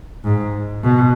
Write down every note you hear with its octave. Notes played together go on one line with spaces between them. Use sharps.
G#2
B2